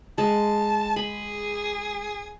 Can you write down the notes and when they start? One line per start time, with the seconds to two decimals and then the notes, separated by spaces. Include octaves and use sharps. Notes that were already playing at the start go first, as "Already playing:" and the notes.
0.18 G#3 A5
0.96 G#4 B5